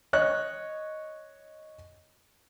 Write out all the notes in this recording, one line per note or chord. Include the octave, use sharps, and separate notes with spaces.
C#5 D#5 F#6